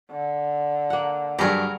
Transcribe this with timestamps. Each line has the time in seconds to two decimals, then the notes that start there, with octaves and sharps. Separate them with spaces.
0.11 D3
0.90 A#3 F#5
1.39 G2 F#3 D4 G4 G#4 A#4 C#5 A#5